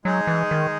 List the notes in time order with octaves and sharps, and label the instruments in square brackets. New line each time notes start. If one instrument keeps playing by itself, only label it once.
[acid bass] F#3 [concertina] G#3 D#4 G#4
[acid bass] E3
D#3